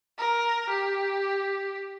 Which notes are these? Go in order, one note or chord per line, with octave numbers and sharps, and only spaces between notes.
A#4
G4